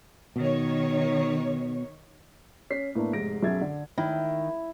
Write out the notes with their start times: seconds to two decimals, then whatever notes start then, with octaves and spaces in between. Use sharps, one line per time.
0.36 B2 D#3 C#5
2.70 C#4 B6 C7
2.95 A2 A#3 B3 D4
3.13 F1 G#2 A#6 D7
3.43 B1 F#2 G#4 E5 G#6 A6
3.61 D3
3.98 D#3 E4